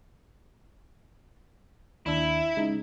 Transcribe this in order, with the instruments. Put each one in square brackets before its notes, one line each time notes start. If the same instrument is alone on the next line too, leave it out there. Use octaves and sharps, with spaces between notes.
[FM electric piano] D#2 D4 E6 [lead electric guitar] E4
[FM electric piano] C#3 G#3 D#4